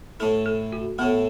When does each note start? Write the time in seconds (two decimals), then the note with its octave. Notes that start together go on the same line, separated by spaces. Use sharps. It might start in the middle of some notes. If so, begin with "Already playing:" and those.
0.20 A2 A3 E4 A4
0.46 A4
0.72 F#4
0.98 A2 A3 B3 E4